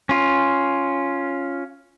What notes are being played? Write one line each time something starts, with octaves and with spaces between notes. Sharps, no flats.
C#4 F4